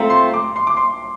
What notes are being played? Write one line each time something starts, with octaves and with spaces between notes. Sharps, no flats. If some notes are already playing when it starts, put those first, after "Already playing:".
Already playing: A3 C4 F4 A#5
C6
D6
C6
D6
C6